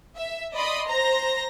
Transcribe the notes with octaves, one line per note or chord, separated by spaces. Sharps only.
E5
D5 D#5 B5 C6 D#6
C5 A#5 A#6